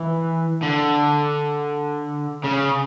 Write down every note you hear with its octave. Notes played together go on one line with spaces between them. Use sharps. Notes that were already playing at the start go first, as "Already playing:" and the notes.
Already playing: E3
D3
C#3